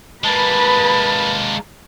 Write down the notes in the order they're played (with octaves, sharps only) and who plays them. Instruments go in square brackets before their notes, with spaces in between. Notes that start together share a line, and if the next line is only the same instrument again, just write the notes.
[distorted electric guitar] G#3 A#3 [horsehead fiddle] B4 B5 [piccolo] A5